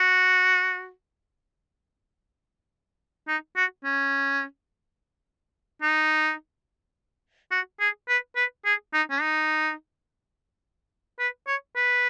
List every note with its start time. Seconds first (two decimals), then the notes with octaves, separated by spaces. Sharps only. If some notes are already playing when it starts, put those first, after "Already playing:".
Already playing: F#4
3.28 D#4
3.56 F#4
3.84 C#4
5.82 D#4
7.51 F#4
7.80 G#4
8.09 B4
8.36 B4
8.65 G#4
8.94 D#4
9.10 C#4
9.21 D#4
11.19 B4
11.47 C#5
11.76 B4